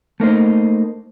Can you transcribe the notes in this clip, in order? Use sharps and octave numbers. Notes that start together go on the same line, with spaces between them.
A3 A#3 D#4 C5